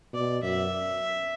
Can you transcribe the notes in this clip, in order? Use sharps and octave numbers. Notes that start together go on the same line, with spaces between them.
B2 D5
F#2 E5